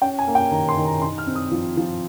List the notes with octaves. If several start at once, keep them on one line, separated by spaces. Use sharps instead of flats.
C#4 G5
G#5
A#3
G5
D#3 A#5
C6
D#3
A#5
D#4 C6
F6
C4
D#6
F3
F3